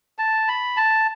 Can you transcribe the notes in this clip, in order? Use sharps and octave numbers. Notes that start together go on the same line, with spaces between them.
A5
B5
A5